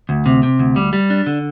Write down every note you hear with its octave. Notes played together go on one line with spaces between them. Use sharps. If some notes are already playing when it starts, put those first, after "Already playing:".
D2
C3
C3
D2
G3
G3
D4
D3